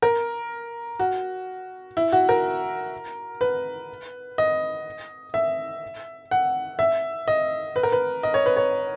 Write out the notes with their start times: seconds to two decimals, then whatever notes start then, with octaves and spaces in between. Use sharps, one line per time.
0.02 A#4
0.99 F#4
1.97 E4
2.12 F#4
2.29 A#4
3.41 B4
4.38 D#5
5.34 E5
6.31 F#5
6.79 E5
7.28 D#5
7.76 B4
7.83 A#4
7.92 B4
8.23 D#5
8.34 C#5
8.46 B4
8.56 C#5